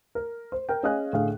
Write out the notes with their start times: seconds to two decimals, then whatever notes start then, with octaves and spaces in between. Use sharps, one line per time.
0.15 A#4
0.52 C5
0.69 A#4 G5
0.83 C#4 G#4 D#5 F5 G#5 F#6
1.13 A2 D3 G#4 F5